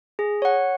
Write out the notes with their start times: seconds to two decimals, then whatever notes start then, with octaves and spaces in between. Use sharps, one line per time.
0.19 G#4
0.42 C#5 F#5